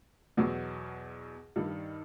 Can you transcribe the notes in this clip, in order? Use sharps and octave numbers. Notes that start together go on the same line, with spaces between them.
E2 B2 F#3
G2 D#3 G3